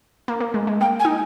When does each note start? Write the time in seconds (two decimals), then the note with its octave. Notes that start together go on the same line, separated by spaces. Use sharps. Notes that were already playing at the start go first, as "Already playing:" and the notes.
0.28 A#3
0.40 A#3
0.54 G#3
0.67 G#3
0.81 A#3 G5
1.00 G#5
1.05 D#4